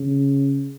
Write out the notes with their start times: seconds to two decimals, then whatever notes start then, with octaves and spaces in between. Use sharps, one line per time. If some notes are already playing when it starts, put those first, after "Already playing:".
Already playing: C#3